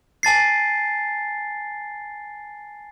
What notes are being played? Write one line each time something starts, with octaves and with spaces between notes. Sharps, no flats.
G#5 A5 A6 C7